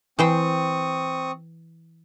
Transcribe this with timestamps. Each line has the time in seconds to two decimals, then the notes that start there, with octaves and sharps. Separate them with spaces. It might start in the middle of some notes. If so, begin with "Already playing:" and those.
0.19 E3 C4 C5 G5 C#6 D#6